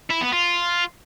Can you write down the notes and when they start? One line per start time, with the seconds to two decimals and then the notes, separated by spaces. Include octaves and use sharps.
0.10 E4
0.22 B3
0.33 F4